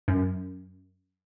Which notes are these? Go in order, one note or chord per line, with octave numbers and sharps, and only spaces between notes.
F#2